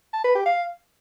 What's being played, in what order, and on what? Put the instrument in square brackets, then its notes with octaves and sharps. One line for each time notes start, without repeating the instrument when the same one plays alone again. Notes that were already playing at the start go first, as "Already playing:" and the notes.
[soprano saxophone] A5
B4
G4
F5